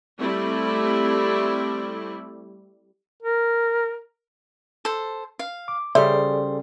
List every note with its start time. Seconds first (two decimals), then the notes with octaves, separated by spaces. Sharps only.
0.18 G3 A3 C4 E4
3.22 A#4
4.85 A4 C5
5.39 F5
5.68 D6
5.95 C#3 G3 G#4 A4 C5 D5 E5